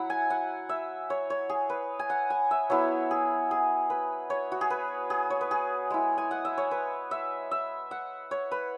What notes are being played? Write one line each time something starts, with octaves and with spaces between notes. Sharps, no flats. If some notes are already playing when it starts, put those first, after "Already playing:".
Already playing: F#3 E4 F#5 B5
G#5
F#5
E5
C#5
C#5
G#4
B4
G#5
F#5
G#5
E5
F#3 B3 E4 C#5
G#4
G#4
B4
C#5
F#4
G#4
B4
G#4
C#5
B4
G#4
G#3 E4
G#5
F#5
E5
C#5
B4
E5
E5
F#5
C#5
B4